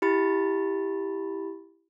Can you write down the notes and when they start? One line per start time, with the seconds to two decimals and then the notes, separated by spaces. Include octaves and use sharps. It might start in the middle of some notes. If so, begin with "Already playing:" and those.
0.02 E4 G4 B5 A6